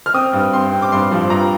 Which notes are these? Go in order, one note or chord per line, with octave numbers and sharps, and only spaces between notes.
F6
C4 D#6
G2
C4 C6
C4
D6
G2 C6
F3
G2 A#5